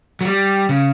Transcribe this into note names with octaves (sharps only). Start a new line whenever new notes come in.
F#3
G3
C#3